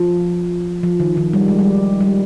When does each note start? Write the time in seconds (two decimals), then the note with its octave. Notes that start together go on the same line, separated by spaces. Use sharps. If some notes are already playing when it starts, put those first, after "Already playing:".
Already playing: F3
0.83 F3
1.00 D#3
1.17 D#3
1.33 G3
1.48 G#3
1.59 G3
2.00 G3